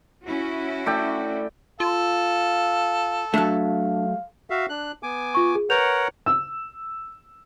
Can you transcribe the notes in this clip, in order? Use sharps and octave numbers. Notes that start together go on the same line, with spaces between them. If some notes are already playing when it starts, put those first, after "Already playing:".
C#4 E4 F#4
A3 D5 G5
F4 A4 F5
F#3 A3 D4 F5
F#4 E5 F5
D4 F#6
B3 G#5 D6
F4 C#6
G#4
A#4 B4 C#5 F#5 G6 F7
E6